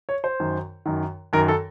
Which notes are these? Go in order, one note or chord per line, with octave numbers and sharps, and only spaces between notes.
C#5
C5
F#2 D#3
F#2 D#3
F#2 D#3 A#4
A4